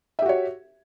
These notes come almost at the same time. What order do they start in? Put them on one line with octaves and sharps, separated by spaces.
E5 G4 F#4 C#5